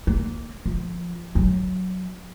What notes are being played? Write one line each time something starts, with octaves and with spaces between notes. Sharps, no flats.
A#3
F3
F#3